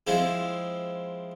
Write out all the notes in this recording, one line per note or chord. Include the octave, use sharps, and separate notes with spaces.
F3 G#3 C4 E4